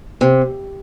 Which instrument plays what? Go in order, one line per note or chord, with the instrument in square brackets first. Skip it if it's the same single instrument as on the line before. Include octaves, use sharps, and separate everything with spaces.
[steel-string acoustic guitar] C3